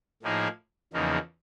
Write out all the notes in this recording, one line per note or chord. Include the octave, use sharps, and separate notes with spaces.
A2 F3 A#3 D#4 G#4
E2 C#3 F3 A#3 D#4